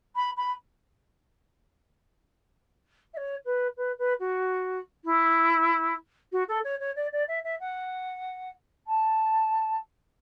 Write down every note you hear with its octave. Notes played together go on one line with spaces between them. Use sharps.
B5
B5
E5
C#5
B4
B4
B4
F#4
E4
F#4
A4
C#5
C#5
D5
D5
E5
E5
F#5
A5